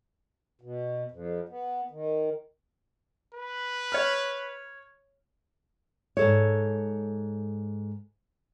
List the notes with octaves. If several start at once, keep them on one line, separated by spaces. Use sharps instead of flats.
B2
F2
B3
D#3
B4
C#5 F6
G#2 A4 C#5